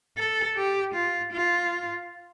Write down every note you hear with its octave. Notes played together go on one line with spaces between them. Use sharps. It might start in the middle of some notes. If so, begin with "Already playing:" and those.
A4
G4
F4
F4